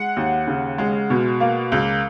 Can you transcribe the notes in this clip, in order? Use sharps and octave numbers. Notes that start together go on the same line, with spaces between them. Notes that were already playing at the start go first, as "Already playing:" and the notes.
Already playing: G#3 F#5
D#2
C#3
G#3
B2
A#3
C#2